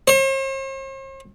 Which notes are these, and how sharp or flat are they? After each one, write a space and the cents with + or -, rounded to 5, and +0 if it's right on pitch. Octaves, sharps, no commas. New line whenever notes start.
C5 +45